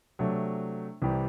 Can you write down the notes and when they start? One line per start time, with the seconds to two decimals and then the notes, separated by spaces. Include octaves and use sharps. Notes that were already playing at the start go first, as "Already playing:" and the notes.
0.19 C3 F#3 A3 D4
1.02 C2 C3 E3 G3